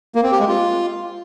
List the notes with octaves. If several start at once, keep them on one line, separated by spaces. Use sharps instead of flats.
A#3
C4
G4
G#3
F4